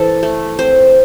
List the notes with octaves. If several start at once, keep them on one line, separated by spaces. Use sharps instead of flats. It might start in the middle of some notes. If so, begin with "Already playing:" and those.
Already playing: E3 A4 C5
A3
C4 C5